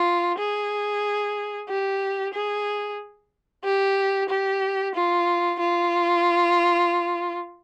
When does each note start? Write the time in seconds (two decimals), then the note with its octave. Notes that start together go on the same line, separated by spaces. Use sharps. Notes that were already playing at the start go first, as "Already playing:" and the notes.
Already playing: F4
0.38 G#4
1.69 G4
2.34 G#4
3.64 G4
4.29 G4
4.95 F4
5.59 F4